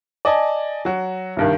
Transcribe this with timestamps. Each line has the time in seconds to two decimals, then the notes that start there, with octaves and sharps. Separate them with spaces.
0.25 D5 D#5 G#5 A5
0.85 F#3 F#4
1.37 C2 G2 D#3